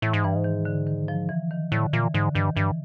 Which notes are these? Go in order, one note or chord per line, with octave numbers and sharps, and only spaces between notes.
A2 E3
G#2
G2 E3
G#2
D#3
D3
D#3
F3
E3
D#3
A2 D3
A#2 E3
G#2 D3
G2 D#3
G2 E3